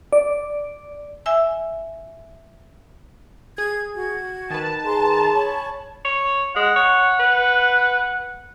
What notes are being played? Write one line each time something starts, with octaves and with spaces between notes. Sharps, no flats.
D5
E5 G#5 E6
G#4 G#6
F#4 G#6
D#3 B4 A5
G#4 A#5 C6
C#5 B5 C#6
C#5
G#3 F#5
C#5
B4